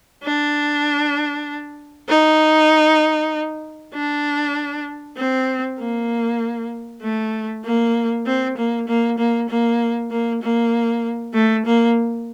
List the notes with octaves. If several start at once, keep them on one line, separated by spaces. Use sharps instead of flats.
D4
D#4
D4
C4
A#3
A3
A#3
C4
A#3
A#3
A#3
A#3
A#3
A#3
A3
A#3